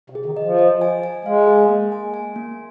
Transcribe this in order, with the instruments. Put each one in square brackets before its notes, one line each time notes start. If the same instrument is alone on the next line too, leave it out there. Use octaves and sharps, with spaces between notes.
[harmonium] C3
[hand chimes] G#4
[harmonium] D#3
[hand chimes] D#5
[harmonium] F3
[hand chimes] D#5
G#5
G#5
[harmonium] G#3 [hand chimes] F5
[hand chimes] G#4
A#3
G#5
G#5
A#3